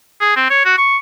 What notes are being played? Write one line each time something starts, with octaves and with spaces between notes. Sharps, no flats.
G#4
C4
C#5
F#4
C#6